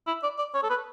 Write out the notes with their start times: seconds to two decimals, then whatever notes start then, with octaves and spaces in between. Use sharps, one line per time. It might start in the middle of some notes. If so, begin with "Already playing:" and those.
0.07 E4
0.23 D5
0.38 D5
0.54 C#5
0.63 A4
0.70 B4